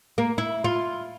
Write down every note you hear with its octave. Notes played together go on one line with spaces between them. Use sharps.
A#3
E4
F4